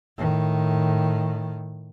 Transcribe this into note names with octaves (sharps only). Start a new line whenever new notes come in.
A2 D#3